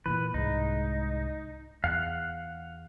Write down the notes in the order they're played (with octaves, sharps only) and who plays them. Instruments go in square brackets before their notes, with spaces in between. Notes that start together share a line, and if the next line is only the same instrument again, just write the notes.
[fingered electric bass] A#2 C#3 E3 [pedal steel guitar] B4
[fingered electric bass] C2 G#2 G#3 [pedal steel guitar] D#4
[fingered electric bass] E2 [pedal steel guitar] F5 F#5 F#6